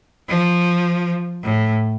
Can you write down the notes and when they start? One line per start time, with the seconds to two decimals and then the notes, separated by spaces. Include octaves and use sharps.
0.29 F3
1.44 A2